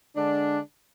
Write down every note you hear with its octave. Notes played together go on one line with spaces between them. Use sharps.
D3 G#3 D4